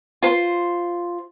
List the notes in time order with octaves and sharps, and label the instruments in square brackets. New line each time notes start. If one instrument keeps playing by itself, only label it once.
[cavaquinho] F4 C5